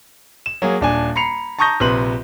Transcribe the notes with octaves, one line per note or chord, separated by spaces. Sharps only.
E7
F#3 A#3 G#4
D#1 D4 G#5
A#5 B5 C7 C#7 F7
A5 A#5 C#6 D#6 G6 A#6
A#1 C3 B4 C6 F#7